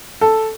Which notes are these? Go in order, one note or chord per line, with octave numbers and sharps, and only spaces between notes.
A4